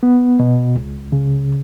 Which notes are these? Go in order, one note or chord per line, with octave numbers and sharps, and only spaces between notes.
B3
B2
C#2
C#3